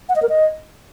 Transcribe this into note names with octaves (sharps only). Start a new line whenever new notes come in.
F#5
D#5
A#4
D#5